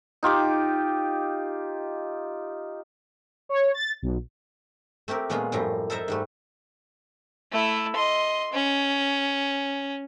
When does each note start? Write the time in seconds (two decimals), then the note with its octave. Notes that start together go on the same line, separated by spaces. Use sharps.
0.23 D#4 F4 G4 D6
3.49 C#5
3.74 A6
4.02 B1
5.08 A3 C4 G4 A#4
5.29 A#2 G#3 B3 C#4 F4 G#4
5.52 F#2 A2 F3 G3 A#5
5.90 A4 A#4 C5 D#5 E5 A#5
6.08 G#2 G3 A3
7.52 A3 E4
7.96 D#5 C6
8.53 C#4